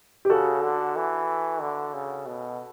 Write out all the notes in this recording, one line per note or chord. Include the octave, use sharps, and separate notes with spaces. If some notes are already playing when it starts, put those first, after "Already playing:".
G4
C#3 F#4 A4
D3
E3
D3
C#3
B2